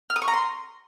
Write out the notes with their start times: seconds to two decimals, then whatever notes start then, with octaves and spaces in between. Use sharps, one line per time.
0.10 F6
0.16 D#6
0.22 C#6
0.28 A#5
0.34 C6